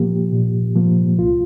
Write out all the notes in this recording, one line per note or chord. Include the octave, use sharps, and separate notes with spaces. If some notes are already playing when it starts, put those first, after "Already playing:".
Already playing: A#2 F3 A#3 G4
A#2
F3 A#3
C2 F4